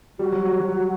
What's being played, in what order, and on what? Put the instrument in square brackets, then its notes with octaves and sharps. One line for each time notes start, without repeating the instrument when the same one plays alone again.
[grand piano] G3 [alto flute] F#4
[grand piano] F#3
F#3
F#3